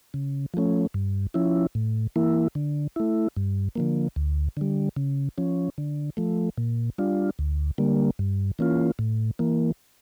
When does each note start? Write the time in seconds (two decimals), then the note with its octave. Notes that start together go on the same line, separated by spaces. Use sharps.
0.14 C#3
0.54 F3 A3 C#4
0.94 G2
1.34 F3 C#4 E4
1.75 A2
2.16 E3 A#3 E4
2.55 D3
2.96 A3 E4
3.36 G2
3.76 D3 F3 A#3
4.16 D2
4.57 D3 G3
4.96 C#3
5.38 F3 C#4
5.78 D3
6.17 F3 A3
6.58 A#2
6.98 G3 D4 F4
7.39 D2
7.78 D3 G3 A#3
8.19 G2
8.59 E3 A#3 C#4 F4
8.99 A2
9.39 E3 A#3